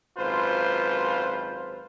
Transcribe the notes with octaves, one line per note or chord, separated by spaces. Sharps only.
G#1 F#2 F4 B4 C5